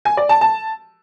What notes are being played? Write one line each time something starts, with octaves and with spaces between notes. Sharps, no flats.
G#5
D5
A5
A5